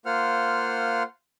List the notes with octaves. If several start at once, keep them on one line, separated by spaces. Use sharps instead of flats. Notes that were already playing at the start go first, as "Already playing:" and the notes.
A#3 F4 C5 F#5 F6